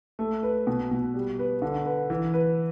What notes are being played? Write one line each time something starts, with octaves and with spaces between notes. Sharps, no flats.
A3
B4
B2
B2
G3
B4
D3
B4
E3
B4